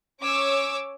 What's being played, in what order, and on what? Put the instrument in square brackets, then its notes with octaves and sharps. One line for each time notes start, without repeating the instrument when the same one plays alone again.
[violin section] C#4 C#5 D6 E6